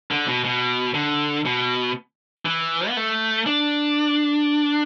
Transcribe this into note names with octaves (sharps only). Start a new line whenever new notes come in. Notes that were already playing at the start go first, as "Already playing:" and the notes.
D3
B2
B2
D3
B2
E3
B3
A3
D4